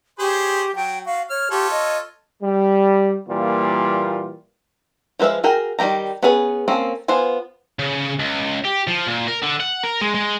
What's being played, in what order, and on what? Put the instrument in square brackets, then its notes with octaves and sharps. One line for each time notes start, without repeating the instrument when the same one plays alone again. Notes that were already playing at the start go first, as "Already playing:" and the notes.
[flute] G4 [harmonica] G#4 C5 C#5
[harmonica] F#3 [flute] G5
[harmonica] F#4 [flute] F5
[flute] C#5 [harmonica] F6
[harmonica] F4 A4 C#5 [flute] G4
[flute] D#5
[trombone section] G3
A#2 E3 G3 A#3 F4
[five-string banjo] F3 G#3 B4 E5 F5
F#4 G#4 A#4 G5
D#3 G3 A#3 G4 A#5
B3 C#4 G#4 B4
A#3 C4 C#4 A4
B3 F4 C5 G#5
[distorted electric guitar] C#3
C#2
G4
F3
A#2
A#4
D3
F#5
A#4
G#3
G#3